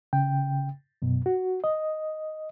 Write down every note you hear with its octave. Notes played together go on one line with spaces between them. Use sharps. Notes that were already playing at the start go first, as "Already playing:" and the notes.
C#3 G5
F#2 B2
F#4
D#5